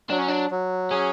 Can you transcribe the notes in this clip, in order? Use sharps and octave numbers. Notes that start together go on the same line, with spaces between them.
F#3 D4
C#4
D4
F#3
C#4 G#4